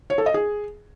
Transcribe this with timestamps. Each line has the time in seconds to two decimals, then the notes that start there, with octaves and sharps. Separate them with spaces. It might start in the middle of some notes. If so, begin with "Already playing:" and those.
0.10 C#5
0.18 A4
0.26 D#5
0.34 G#4